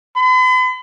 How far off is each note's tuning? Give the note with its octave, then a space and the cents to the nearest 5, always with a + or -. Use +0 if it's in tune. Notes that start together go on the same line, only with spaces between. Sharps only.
B5 +45